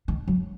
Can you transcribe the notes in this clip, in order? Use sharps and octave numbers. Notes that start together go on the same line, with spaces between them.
D#3
F#3